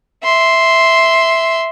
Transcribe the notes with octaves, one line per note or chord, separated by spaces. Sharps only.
E5 C6